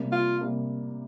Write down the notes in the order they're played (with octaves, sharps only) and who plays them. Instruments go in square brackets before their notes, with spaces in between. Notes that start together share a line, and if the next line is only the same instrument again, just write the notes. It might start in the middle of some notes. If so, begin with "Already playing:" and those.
Already playing: [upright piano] C3 G3 A#3
[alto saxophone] F4
[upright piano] C3 G3 A#3